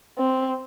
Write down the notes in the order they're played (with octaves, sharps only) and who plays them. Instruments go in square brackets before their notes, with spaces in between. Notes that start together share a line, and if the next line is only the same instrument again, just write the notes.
[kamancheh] C4